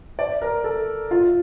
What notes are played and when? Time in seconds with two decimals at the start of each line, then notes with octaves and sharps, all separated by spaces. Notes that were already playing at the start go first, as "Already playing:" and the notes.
0.19 D5
0.42 A#4
0.64 A4
1.11 F4